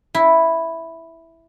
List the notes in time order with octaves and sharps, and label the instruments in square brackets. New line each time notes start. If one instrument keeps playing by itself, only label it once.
[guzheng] E4